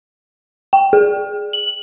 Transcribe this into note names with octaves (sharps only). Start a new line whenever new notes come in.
G5
G#4
F#7